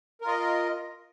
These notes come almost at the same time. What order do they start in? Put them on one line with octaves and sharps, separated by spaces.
A#4 F4 D#5